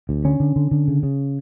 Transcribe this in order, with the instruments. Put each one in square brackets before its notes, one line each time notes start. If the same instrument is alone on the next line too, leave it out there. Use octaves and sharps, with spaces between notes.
[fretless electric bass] D2
D3 C#4
D3
D3
D3
C#3
C#3